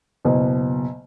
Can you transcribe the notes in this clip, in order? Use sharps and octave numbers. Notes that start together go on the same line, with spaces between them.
F#1 B2